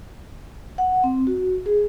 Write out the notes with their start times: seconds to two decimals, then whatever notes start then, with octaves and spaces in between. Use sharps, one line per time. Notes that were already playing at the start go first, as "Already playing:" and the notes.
0.78 F#5
1.04 C4
1.27 F#4
1.66 G#4